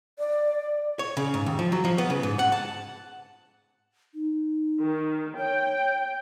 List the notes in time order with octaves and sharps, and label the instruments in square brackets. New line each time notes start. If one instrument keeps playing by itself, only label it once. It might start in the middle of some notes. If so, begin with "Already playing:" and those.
[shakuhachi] D5
[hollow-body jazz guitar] C#5
C#3
G#2
D#2
F3
F#3
F3
B3
C#3
G#2
F#5
A5
[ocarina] D#4
[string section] D#3
[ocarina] C#5 [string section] G5